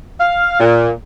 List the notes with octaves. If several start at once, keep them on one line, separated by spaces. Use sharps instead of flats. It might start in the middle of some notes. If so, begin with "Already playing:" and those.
F5
A#2